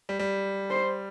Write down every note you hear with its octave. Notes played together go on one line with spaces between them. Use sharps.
G3
G3
C5